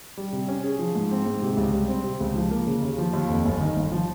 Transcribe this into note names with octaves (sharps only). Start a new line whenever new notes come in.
G3
C3
C#4
G#4
F3
G#2
C4
G#2
C3
C#2
G3
C4
C3
C#2
F3
A#3
C#3
D#2
F3
D#2
F2
G1
D#3
G1
F3